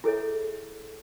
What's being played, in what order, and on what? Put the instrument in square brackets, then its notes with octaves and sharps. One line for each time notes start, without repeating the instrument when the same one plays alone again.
[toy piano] E4 G#4 A4 C#5 E5